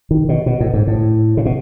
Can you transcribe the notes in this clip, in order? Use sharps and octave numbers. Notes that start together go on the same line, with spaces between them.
D#3
B2
B2
A2
G#2
A2
C#3
B2